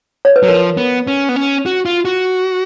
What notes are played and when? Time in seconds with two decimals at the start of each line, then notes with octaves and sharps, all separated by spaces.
0.25 C#5
0.36 B4
0.43 F#3
0.48 F3 A#4
0.77 B3
1.07 C#4
1.29 B3
1.36 C#4
1.66 F#4
1.85 F4
2.05 F#4